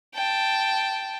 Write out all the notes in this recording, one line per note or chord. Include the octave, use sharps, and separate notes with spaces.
G5 A5